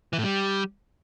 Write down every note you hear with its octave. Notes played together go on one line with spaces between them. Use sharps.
E3
A2
G3